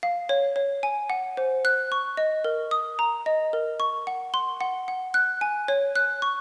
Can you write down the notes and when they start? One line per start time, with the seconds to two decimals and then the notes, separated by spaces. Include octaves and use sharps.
0.03 F5
0.29 C#5
0.56 C#5
0.83 G#5
1.10 F#5
1.37 C5
1.65 F#6
1.92 C#6
2.17 D#5
2.44 A#4
2.71 D#6
2.99 A#5
3.26 D#5
3.53 A#4
3.80 C#6
4.07 F#5
4.34 C6
4.61 F#5
4.88 F#5
5.14 F#6
5.41 G#5
5.68 C#5
5.96 F#6
6.22 C#6